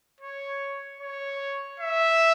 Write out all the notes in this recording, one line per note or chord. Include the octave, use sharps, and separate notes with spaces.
C#5
C#5
E5